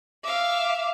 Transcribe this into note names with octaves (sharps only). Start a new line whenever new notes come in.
E5 F5 D6